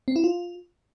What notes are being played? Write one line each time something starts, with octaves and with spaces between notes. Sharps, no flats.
C4
E4
F4